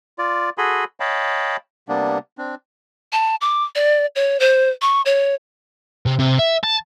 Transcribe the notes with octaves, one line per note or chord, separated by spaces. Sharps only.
F4 D5
F#4 G#4 A4 G#5 B5 C6
C#5 D#5 F5 G5 A5 B5
C3 G3 A#3 B3 D4
C4 D4
A5
D6
D5
C#5
C5
C#6
C#5
C3
C3
E5
A5